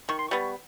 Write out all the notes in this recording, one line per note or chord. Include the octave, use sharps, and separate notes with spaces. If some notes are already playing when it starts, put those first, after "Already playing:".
D#3 C#6
C6
G3 B3 C#6